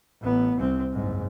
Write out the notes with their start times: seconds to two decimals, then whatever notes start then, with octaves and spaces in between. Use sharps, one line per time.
0.21 A1 B3
0.58 C2 C4
0.93 F#1 G#2